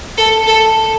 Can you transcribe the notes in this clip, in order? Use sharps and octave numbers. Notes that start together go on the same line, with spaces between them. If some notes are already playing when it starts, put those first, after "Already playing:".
A4
A4